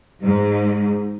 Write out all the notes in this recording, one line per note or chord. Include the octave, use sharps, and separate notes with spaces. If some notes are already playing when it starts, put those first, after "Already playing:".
G#2